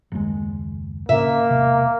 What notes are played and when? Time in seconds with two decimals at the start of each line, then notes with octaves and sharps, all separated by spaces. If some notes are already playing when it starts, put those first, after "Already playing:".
0.12 F#1 D#2 G#3
1.09 A2 C#3 A#3 C#4 E5
1.50 E1 C3